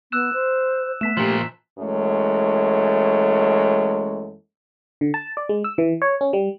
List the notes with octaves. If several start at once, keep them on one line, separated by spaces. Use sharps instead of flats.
B3 E6 F#6 E7
C5
A3 B3 A5 B6 E7
A#2 F3 G4
F#2 E3 G#3 A3
D3
A5
D5
G#3
E6
E3
C#5
C#4
G3